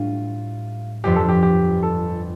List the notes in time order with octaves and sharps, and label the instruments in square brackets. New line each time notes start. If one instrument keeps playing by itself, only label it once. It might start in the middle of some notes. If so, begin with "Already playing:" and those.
Already playing: [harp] A2 G3 D4 [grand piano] F4
[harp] G1 F2 F3 [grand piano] G4
[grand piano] A4
G4
G4
A4